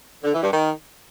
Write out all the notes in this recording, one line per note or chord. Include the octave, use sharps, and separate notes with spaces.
D3
E3
G2
D#3